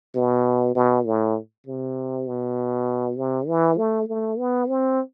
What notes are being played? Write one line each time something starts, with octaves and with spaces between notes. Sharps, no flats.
B2
B2
A2
C3
B2
C3
E3
A3
A3
B3
C4